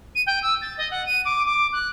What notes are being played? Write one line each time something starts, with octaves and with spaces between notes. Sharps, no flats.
D#7
G5
E6
A6
D#5
F#5
D#7
D6
D6
F#6